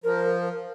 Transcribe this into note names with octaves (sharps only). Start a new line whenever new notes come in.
F3 A#4